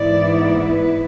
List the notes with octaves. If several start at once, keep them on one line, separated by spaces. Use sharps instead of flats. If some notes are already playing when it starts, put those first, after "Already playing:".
Already playing: G#2 E3 B3 E4 D5
B4